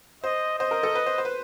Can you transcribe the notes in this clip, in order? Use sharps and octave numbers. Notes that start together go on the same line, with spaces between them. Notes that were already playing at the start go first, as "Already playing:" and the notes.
C5 D#5
C5 D#5
A#4
A4
B4
C5
C5
B4